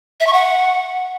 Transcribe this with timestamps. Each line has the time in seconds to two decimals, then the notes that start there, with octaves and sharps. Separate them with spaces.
0.20 E5
0.27 C#6
0.33 F#5